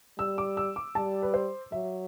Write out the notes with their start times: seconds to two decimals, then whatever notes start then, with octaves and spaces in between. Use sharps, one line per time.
0.18 G3 E6
0.38 D6
0.57 E6
0.76 D6
0.95 G3 A5
1.23 B4
1.34 C5
1.72 F#3 E5